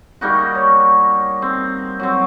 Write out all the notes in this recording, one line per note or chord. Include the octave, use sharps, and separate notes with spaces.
G3 A#3 D#4 F#4
C#5
C4
F#3 C4